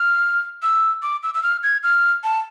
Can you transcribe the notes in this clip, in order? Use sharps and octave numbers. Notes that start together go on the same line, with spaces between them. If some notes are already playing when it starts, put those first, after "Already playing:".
Already playing: F6
E6
D6
E6
E6
F6
G#6
F6
A5